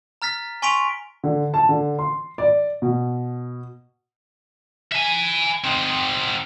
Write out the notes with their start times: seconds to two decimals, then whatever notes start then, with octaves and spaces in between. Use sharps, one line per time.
0.22 A#5 F6 A6 B6
0.62 G#5 C6 C#6 B6 D7 F7
1.24 D3
1.54 A5
1.69 D3
1.99 C6
2.38 D5
2.82 B2
4.92 E5 G#5
5.64 C4 D#4